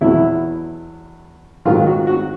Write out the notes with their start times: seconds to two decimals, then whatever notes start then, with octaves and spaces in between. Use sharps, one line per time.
0.01 E2 B2 F#3 E4
1.65 G#2 D#3 F#3 F4
1.87 F#4
2.07 F#4